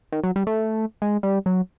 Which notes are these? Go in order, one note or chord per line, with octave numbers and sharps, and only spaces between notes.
D#3
F#3
G3
A3
G#3
G3
F#3